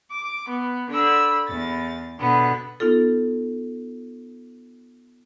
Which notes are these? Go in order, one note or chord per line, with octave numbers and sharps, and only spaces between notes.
D6
B3
D3 B5 E6
E2 A6
B2 D3 B3
B3 D#4 F4 A4